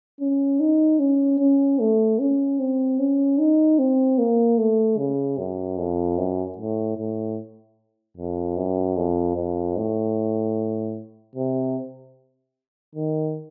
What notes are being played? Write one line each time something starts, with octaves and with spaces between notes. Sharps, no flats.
C#4
D#4
C#4
C#4
A3
C#4
C4
C#4
D#4
C4
A#3
A3
C#3
F#2
F2
F#2
A2
A2
F2
F#2
F2
F2
A2
C3
D#3